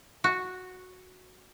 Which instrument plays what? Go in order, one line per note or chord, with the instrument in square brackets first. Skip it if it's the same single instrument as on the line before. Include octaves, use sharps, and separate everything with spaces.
[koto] F#4